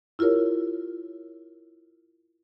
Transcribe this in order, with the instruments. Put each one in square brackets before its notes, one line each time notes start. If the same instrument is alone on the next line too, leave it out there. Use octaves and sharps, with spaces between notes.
[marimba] E4 F4 G4 A#4 C#5